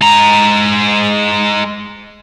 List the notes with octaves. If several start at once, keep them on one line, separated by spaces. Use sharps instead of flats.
G#3 A#5